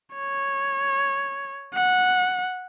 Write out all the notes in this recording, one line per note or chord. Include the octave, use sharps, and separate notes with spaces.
C#5
F#5